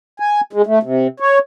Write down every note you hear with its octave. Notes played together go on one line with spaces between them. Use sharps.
G#5
G#3
A3
C3
C#5